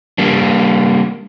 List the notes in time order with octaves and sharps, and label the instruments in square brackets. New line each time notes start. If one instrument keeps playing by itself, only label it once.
[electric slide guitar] G3 A#3 D4